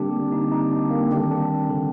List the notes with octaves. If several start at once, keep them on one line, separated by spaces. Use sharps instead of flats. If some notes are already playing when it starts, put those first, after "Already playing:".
Already playing: D3 G3 A#3 C4 D4 G4
D#4
D#4
D4
A#3
D#3 G3 C4 D4
D4
D3